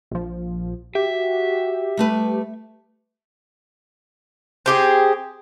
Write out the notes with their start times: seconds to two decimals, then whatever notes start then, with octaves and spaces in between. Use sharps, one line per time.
0.11 A#1 F3
0.95 F#4 G4 E5
1.97 G3 A3 B4
4.66 C4 G4 G#4